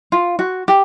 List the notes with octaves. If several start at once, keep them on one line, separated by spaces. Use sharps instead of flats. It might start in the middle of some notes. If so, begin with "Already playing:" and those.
F4
F#4
G4